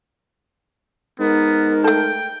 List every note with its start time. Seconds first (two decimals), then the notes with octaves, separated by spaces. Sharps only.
1.20 G#2 B3 A#4
1.84 A3 A4 G5